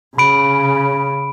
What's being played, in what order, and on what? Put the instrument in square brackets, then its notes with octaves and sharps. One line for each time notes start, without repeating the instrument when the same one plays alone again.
[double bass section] C#3 [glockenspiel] B5 D7